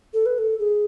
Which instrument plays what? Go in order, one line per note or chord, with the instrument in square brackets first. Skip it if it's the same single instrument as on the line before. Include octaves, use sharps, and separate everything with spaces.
[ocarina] A4
B4
A4
G#4